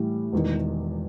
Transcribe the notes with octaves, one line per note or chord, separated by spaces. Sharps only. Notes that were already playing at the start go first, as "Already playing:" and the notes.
Already playing: A2 E3 G3
E1 E2 D#3